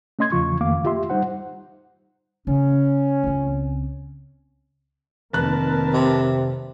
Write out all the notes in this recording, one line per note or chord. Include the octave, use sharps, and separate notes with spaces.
A3 C#4 D#5 C6 G#6
E2 C#3 F3 F4 C#6
F2 D#3 A3 A#3 F5 D6
F4 G4 E5 C6
G3 D#4 C5 F#5
C#3 A#3 C#4
C#2 C4
F1 D#3 A#3 C4 A#4 B4 A5 F#6
C3